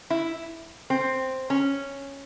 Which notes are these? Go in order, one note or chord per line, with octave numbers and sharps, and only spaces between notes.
E4
C4
C#4